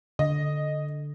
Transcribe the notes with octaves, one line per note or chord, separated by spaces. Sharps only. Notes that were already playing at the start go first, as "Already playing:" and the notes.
D3 D#5